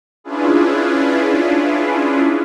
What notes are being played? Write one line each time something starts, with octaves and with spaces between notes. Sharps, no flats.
C#4 D4 E4 F4 G#4 B4